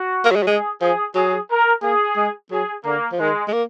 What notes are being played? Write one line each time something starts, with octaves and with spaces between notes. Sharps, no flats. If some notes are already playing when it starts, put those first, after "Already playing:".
Already playing: F#4
A#3
F#3
G#3
F#3
G#3 G#4
F3 G#4
F#3 G#4
A#4
A#3 G#4
G#3
F#3 G#4
D3 A#3
F3
D#3 G#3
G#3
A#3